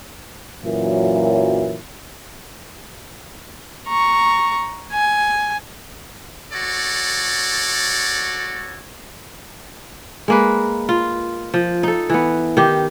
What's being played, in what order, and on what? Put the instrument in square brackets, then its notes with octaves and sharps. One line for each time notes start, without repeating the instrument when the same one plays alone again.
[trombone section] F#2 A#2 E3 F#3
[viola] A#5 C#6
G#5
[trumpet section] F#4 A4 C#5 D5
[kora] G#3 A#3 B4
F4
F3
D#4 A4
E3 B3
D#3 G4